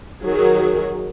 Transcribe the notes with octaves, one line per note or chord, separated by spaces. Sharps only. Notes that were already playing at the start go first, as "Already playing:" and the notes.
D#3 F#3 G#4